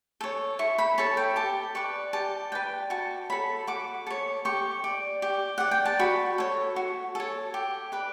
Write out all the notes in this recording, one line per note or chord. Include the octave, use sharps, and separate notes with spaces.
A4 C#5
E4 C#6
B5
A4 C#5 A5
G5
G4 A5
B4 D5 C#6
G4 A5
B4 D5 G5
F#4 A5
A4 C#5 B5
F#4 D6
A4 C#5
G4 C#6
D5
G4
D5 F#5
G5
A5
F#4 B5
A4 C#5
F#4
A4 C#5
G4
B4 D5